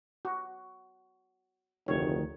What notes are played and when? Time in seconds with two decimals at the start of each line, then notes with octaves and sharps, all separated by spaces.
0.25 F#4
1.88 F1 D2 D#3 C#5